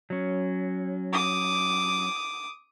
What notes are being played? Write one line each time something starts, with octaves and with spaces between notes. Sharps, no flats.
F#3 C#4
D6 D#6